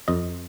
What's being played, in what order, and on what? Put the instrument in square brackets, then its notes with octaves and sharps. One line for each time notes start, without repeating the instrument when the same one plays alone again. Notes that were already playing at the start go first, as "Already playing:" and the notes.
[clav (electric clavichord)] F2 D#5